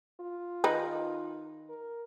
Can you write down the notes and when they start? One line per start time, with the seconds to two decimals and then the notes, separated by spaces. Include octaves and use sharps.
0.21 F4
0.64 D#3 D#4 B4
1.69 A#4